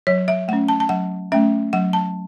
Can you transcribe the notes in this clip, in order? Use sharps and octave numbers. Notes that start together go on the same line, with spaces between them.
F#3 C#5
E5
A3 C#4 F#5
A5
A5
F#3 F#5
A3 C#4 E5
F#3 F#5
A5